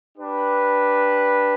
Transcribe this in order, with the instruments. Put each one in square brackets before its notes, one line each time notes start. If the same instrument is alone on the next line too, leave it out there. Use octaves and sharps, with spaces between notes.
[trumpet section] D4 G4 B4